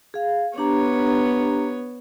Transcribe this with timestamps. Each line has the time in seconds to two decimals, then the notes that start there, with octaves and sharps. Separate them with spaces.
0.14 G#4 F5
0.58 B3 D4 G4 C#5 A#5